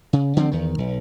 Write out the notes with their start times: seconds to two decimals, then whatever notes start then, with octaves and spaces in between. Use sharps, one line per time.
0.13 C#3
0.37 D3 F3 G3 C4
0.51 E2 D#3
0.78 B1